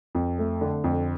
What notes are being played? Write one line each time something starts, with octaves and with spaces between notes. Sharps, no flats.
F2
A3
D3
F2